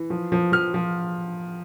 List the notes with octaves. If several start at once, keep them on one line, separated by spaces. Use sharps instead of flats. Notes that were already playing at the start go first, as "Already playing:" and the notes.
Already playing: E3
F3
F3
F3 F6
F3